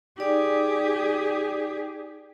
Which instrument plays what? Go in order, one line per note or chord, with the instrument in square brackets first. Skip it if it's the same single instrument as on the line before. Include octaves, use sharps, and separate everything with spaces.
[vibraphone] D#4 D5 [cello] G4 G#4